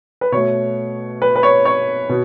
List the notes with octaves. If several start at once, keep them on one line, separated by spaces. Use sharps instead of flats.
B4
B2 A3 C#5
B4
B4
C#5
C#5
B2